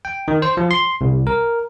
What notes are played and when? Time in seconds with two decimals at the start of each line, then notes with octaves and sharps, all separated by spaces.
0.05 G5
0.28 D#3
0.42 C5
0.57 F3
0.71 C6
1.01 C2
1.27 A#4